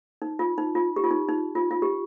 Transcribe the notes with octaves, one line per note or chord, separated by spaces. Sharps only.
D#4
F4
D#4
F4
G4
F4
D#4
D#4
F4
F4
G4